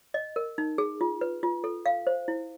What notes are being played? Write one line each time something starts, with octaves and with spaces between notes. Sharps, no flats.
D#5
A#4
D#4
G#4
F4
B4
F4
A4
F5
C5
E4